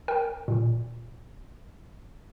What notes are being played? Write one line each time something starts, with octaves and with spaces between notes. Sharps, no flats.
A#4 G5
A#2